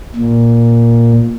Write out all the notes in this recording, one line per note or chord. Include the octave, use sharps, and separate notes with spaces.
A#2